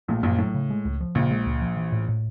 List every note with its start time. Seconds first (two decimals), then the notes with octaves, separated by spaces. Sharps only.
0.08 A#1 A#2 A3
0.23 A#1 F#2 A#2
0.39 A2 F#3
0.54 C#3
0.70 G#3
0.85 C#2
1.01 F3
1.15 A#1 A#2 C#3
1.31 G#3
1.46 C#2
1.62 F3
1.77 E3
1.92 A2
2.08 A2